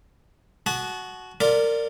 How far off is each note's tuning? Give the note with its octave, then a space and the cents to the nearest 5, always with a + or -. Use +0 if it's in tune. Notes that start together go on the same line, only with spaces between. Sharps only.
F#4 +0 A5 -35 D#6 -40
F4 +0 A#4 -25 D5 +0